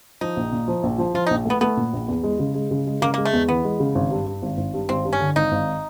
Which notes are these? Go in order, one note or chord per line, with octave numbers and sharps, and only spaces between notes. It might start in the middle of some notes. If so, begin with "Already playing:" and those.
F3 D#4
A#1
A#2
F3
A#1
F3
F3 F4
D#4
A#1
A3 B3
A3 B3
A#2
A#1
E2
G#3
C#3
G#3
C#3
G#3
C#3 A#3
G#3 A#3
A3
E2
E3 B3
G#3
C#3
G#1
G2
G2
G#1
G#1
G2
G#1 C4
G2
C#4
D3
G#1 D#4
G#1